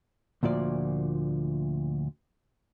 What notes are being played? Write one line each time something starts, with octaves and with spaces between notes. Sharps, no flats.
D2 A#2 F3 D5